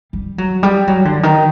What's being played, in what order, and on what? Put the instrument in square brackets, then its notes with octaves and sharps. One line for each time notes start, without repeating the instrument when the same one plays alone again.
[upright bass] G3
F#3
G3
F#3
D3
D#3